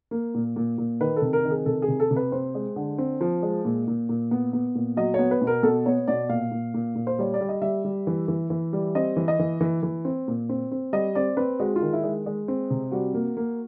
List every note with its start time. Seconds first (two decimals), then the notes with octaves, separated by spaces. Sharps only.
0.11 A#3
0.34 A#2
0.56 A#2
0.78 A#2
1.01 D#3 B4
1.16 A4
1.22 C3
1.33 A#4
1.45 D#3
1.50 G#4
1.66 C3 A4
1.82 G#4
1.88 C3
2.00 A4
2.11 C3
2.16 B4
2.32 C4 C5
2.55 G#3
2.76 D3
2.98 C4
3.21 F3
3.42 G#3
3.65 A#2
3.88 A#2
4.09 A#2
4.31 B3
4.53 B3
4.75 A#2
4.97 F#3 D#5
5.14 B3 C#5
5.31 B4
5.42 B2
5.47 A#4
5.63 B2 A4
5.86 B3 C#5
6.08 B2 D5
6.29 A#2 F5
6.51 A#2
6.74 A#2
6.95 A#2
7.07 C5
7.19 G3 C#5
7.34 D5
7.41 G3
7.49 D#5
7.62 G3 E5
7.85 G3
8.07 E3
8.28 E3
8.50 E3
8.73 G3
8.95 C4 D#5
9.16 E3
9.28 D#5
9.39 E3
9.61 E3
9.83 E3
10.05 C4
10.28 A#2
10.49 C4
10.72 C4
10.93 G3 D#5
11.15 C4 D5
11.37 C4 B4
11.59 G#3 F#4
11.76 F4
11.82 D#3
11.93 E4
12.04 G#3
12.26 G#3
12.48 C4
12.70 C3
12.92 G3 F#4
13.14 A#3
13.37 A#3